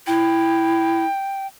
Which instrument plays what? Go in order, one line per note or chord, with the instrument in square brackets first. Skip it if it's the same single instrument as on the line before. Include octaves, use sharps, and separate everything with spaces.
[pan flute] E4 [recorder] G5